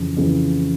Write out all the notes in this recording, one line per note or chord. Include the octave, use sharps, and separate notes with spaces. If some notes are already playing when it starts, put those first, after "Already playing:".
Already playing: F2 C#3 E3
F2 C#3 E3